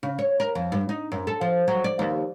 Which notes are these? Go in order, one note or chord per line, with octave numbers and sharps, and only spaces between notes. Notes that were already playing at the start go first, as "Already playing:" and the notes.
C#3
C#5
A#4
F2
G2
D#4
F#2
A4
F3
F#3
D5
D#2